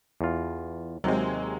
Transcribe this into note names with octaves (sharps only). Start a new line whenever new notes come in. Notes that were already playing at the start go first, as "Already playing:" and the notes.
E2 F4
D#2 C3 F#3 G#3 C4